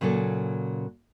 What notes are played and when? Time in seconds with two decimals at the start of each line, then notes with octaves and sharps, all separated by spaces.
0.01 A#2 C#3 F#3 A#3 A4